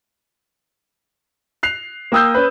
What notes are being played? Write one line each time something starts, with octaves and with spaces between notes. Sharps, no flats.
F#6 C7 F7
A#3 G5 D#6 E6 G6
C#4 B4